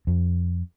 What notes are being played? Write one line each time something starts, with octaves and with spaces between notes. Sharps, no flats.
F2